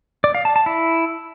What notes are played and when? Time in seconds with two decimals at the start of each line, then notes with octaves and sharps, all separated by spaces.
0.24 D5
0.35 F5
0.45 A5
0.56 A5
0.66 E4